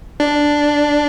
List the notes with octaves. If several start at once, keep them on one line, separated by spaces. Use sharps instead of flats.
D4